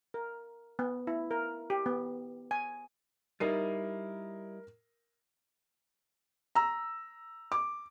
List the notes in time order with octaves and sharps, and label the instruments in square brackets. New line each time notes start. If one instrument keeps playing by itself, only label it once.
[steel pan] A#4
B3
E4
A#4
G4
B3
G#5
[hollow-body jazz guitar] G3 D#4 E4 [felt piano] A#4 C7 D#7
[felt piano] A#5 E6
D6